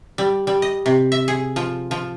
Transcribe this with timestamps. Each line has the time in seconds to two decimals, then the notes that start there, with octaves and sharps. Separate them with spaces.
0.18 G3
0.47 G3
0.62 D#5
0.86 C3
1.12 E5
1.28 G#4
1.56 F3
1.91 F3